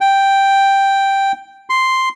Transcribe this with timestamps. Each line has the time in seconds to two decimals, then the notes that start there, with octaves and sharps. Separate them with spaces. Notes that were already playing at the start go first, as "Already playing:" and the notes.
0.01 G5
1.70 C6